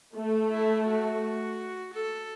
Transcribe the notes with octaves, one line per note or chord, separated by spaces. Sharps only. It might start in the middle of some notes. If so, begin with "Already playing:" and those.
A3
E4
F#4
A4